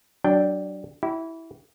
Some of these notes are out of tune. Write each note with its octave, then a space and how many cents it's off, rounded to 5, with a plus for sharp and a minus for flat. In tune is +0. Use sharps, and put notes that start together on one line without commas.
F#3 +25 D4 +0 G5 +0
E4 -10 G4 -45